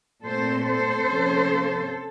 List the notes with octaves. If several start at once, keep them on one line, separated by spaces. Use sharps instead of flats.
A#2 A3 C4 A4 C5
A4 C5
C3 F3 A#3 C#4